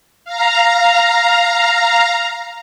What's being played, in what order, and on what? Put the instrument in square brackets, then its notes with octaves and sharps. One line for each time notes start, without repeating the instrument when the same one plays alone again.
[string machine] F5 A#5